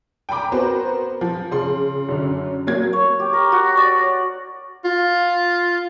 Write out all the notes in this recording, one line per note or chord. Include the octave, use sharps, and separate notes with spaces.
G5 G#5 A#5 B5 D6
B3 F#4 A#4 C5
F3
C#3 C6
F#2 D3 C#4
F#3 A#3 G#6
C#5
G4
A#4
F#4
D5
C#5
F4